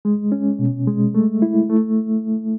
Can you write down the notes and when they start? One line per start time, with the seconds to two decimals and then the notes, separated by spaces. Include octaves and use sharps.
0.05 G#3
0.32 C#4
0.59 B2
0.87 G#3
1.15 A3
1.42 E4
1.69 A3